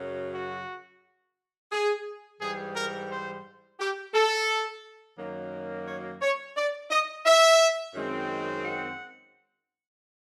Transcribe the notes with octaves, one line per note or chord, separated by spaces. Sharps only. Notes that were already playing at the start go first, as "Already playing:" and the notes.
Already playing: F#2 C#3 F#3
F#4
G#4
G#2 E3 G3 G#4
A#4
C5
G4
A4
F#2 D#3 F#3 A#3
C#5
C#5
D5
D#5
E5
F#2 D#3 G#3 C4
F#5